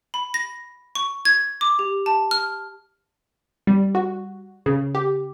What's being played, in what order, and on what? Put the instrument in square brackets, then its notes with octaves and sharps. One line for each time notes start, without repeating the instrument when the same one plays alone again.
[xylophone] B5
A#6
C#6
G#6
D6
G4
A5
F6
[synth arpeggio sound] G3
F#4
C#3
G4